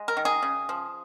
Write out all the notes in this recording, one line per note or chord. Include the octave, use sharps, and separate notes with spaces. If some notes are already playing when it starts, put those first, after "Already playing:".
Already playing: G#3
A#4
D#3
G#4
C#3
F3